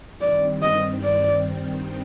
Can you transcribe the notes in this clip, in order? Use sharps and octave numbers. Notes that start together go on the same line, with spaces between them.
G2 D#3 G3 C4 D5
D#5
D5